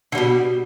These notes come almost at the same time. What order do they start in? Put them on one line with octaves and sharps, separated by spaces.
D3 G3 B2